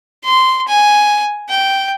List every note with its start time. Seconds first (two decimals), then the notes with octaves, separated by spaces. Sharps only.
0.24 C6
0.68 G#5
1.49 G5